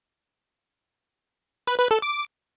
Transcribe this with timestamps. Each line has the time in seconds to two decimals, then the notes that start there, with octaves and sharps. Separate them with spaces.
1.67 B4
1.79 B4
1.91 A4
2.02 D6